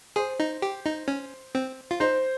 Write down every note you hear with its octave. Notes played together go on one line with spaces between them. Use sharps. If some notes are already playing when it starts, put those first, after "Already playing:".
G#4 C5
D#4
G4
D#4
C#4
C4
F4
D#4 C5